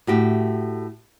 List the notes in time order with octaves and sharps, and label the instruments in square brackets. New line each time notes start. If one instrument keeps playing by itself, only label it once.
[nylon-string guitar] A2 F#4 G4